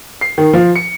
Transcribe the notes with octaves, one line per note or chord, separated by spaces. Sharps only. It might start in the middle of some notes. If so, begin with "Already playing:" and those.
C7
D#3
F3
C#7